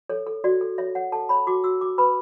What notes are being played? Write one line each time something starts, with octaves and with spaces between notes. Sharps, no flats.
A4 C#5
A4
F#4 D5
A4
C#5 E5
C#5 F#5
A4 A5
C#5 B5
F#4 D6
F#4 E6
F#4 D6
B4 B5